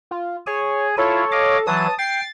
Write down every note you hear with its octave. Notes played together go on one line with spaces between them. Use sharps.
F4
G#4 C#5 G#5
E4 F4 A4 C#5
D#5 F5 D6
E3 F#3 A5 D#6
G5 A6 C7